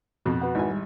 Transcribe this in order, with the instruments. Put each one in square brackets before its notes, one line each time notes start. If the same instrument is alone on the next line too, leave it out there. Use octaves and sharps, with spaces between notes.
[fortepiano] F2 B2
[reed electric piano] F#4 B4 F#5
[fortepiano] G#1 E4 G#5
[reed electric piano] G3